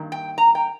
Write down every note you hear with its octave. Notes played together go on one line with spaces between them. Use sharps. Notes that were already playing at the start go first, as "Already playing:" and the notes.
Already playing: G2 D#3 A#3
G5
A#5
G5